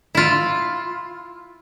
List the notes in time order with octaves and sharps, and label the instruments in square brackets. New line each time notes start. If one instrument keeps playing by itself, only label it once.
[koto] E4 F4